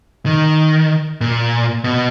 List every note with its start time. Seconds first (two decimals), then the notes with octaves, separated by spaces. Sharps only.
0.26 D#3
1.21 A#2
1.84 B2